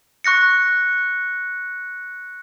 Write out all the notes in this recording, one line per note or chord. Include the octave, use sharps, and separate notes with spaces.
C#6 F#6 A#6 C#7